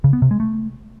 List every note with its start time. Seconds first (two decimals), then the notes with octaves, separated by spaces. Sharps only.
0.04 C#3
0.13 B3
0.22 C3
0.31 G#3
0.40 A3